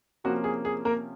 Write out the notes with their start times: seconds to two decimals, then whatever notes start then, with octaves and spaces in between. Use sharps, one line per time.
0.24 C3 F3 A#3 C#4 F#4
0.44 G#4
0.65 G#4
0.85 A#3 A#4